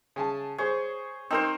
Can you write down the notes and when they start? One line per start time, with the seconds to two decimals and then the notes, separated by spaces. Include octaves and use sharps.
0.16 C#3 G#5 A5
0.58 G#4 C5 C#5
1.31 C4 D#4 A#4 C5